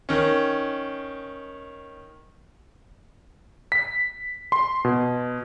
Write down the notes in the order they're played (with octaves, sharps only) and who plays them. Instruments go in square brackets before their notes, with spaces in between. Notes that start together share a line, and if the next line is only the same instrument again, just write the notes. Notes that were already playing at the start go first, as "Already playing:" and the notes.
[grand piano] D#3 C#4
[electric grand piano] B6
C6
B2